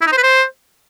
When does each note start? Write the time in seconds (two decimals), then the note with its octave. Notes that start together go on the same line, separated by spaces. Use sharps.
0.01 E4
0.07 D#4
0.12 C5
0.18 B4
0.23 C5